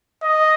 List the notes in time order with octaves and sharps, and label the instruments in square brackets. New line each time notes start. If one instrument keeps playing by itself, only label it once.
[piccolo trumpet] D#5